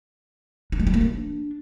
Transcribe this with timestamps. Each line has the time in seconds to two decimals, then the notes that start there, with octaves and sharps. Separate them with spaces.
0.72 D4
0.79 G#3
0.87 G3
0.94 A#3
1.01 D4